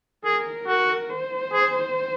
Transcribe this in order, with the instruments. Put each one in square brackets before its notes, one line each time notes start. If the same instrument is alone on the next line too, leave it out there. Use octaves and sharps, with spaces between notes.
[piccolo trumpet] G#4 [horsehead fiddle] A#4
[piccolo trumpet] F#4
[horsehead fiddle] C5
[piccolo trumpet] G#4